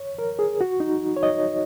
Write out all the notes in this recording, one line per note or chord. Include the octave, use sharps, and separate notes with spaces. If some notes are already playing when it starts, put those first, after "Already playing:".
Already playing: C#5
A#4
G#4
F#4
D#4
C#5
D#5